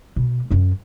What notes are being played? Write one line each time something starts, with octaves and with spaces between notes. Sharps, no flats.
B2
F#2 C#4